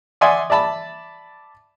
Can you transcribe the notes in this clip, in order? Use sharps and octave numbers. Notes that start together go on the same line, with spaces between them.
D5 E5 F#5 G#5 C6 D#6
D5 E5 A5 B5